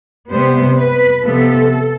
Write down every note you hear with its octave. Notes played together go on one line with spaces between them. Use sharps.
C3 G3 B3 C5
B4
C3 F3 B3 A4